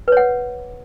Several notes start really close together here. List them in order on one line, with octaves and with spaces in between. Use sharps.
B4 C#5 F#5